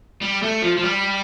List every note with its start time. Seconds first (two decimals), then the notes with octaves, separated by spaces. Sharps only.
0.21 G3
0.43 A3
0.62 F3
0.76 F3
0.83 G3